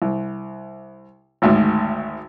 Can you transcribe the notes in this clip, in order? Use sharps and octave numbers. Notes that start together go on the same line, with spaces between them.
C2
G#1 D2 G#2